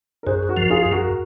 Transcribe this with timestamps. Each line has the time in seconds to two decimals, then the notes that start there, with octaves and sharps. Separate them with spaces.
0.23 A#4
0.26 F#2 G#4 C5
0.49 F#4 A#4
0.57 F3
0.62 A#4
0.70 F4 G#4
0.83 F#2 G#4
0.92 F#4 A#4